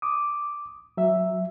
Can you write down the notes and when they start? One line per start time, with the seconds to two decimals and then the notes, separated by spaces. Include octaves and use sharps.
0.02 D6 D#6
0.97 F#3 E5